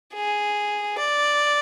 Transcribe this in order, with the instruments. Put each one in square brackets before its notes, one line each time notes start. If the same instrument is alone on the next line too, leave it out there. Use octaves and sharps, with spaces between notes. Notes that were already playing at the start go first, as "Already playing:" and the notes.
[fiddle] G#4
D5